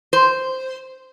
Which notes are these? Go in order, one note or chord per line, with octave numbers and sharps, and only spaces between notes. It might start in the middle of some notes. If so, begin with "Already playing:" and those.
C5